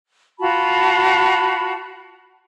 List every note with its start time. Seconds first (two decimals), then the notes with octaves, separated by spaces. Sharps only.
0.40 F4 F#4 A5 B5